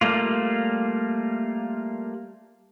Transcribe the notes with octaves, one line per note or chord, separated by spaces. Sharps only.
G3 A3 A#3 F4